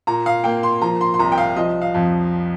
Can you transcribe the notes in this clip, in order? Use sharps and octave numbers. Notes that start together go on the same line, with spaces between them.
A#2 A#5
F5
A#3 G5
C6
F3 A#5
C6
C6
C2 A#5
G5
F5
F3 D#5
F5
F2